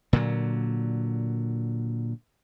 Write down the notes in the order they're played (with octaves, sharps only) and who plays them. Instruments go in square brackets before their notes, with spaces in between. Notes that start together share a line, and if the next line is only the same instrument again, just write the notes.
[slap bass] A#2 D3 F#3